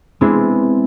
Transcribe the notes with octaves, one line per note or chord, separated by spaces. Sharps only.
G#3 B3 C4 D4 E4